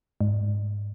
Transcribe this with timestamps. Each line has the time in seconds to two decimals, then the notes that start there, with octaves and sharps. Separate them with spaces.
0.21 G#2